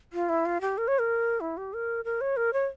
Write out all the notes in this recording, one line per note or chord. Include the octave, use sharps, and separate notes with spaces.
F4
E4
F4
G4
A#4
C#5
A#4
E4
G4
A#4
A#4
C#5
A#4
C#5